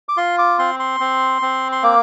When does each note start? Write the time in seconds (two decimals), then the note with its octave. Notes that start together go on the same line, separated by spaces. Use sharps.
0.09 D6
0.17 F4 C6
0.38 D6
0.59 C4 C6
0.79 C6
1.00 C4
1.42 C4
1.72 C6
1.83 A#3 D6